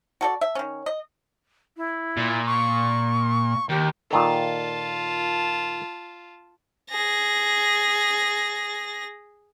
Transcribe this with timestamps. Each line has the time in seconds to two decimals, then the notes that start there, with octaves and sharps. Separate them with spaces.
0.21 F#4 A4 D5
0.41 E5
0.55 D#3 C#4
0.86 D#5
1.77 E4
2.17 A#2
2.46 C#6
3.70 D#2 G4
4.11 A#2 D#3 F4 A4 A5
6.90 G#4 A#6